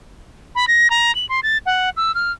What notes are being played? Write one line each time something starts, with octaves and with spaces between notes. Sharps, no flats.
B5
A#6
A#5
F#7
C6
A6
F#5
E6
F6